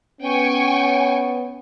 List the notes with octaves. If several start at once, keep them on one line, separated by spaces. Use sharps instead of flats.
B3 C#4 G5 G#5 C#6